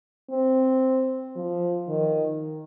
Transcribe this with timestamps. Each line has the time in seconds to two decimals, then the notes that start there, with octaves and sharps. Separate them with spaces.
0.30 C4
1.36 F3
1.89 D#3